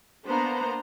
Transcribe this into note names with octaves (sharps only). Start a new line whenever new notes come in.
A#3 B3 D4 C5 A#5